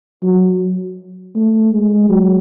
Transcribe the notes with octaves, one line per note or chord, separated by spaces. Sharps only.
F#3
A3
G#3
F#3